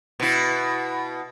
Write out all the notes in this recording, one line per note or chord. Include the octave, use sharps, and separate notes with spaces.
B2 E4